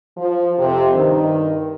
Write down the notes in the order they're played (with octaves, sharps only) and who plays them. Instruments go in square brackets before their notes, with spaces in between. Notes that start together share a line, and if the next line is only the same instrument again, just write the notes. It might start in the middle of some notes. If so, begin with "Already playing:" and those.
[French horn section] F3
F2 C3
G2 D#3